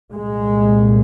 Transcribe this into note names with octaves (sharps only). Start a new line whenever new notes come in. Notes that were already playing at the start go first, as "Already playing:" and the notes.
C2 A#2 G#3